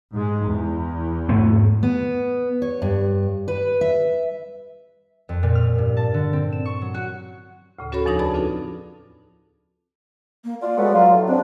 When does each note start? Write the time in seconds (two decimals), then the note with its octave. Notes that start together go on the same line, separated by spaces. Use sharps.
0.14 G#2 G#3
0.46 E2
1.29 G#2 A3 B3
1.83 B3
2.62 C#5
2.82 G2
3.48 B4
3.81 E5
5.29 F2
5.43 A#2
5.55 F6
5.78 G2
5.97 A5
6.14 D3
6.33 C4
6.52 E7
6.65 C#6
6.81 F#3
6.94 F#4
7.79 D2 A2 C#3
7.92 C#4 F#4 A4 A#4 C#5 B5
8.06 E2 F3 D4 D#4 D#6 A#6
8.19 D#4 G#4 B4 D5 A5 B5
8.34 C4 D4 F4 F#4 A4
10.44 A#3
10.61 F4 D5
10.77 F#3 G#3 A3 B3
10.93 F#3 F4
11.12 A2
11.28 F2 G#2 C4 D4